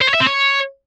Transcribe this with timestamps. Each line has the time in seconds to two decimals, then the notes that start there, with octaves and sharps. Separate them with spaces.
0.01 C5
0.07 C#5
0.14 E5
0.20 C4
0.27 C#5